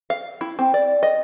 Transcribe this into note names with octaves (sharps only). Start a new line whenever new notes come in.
F5
E4
C4
D5
D#5